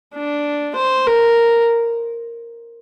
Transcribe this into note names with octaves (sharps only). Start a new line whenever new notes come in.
D4
C5
A#4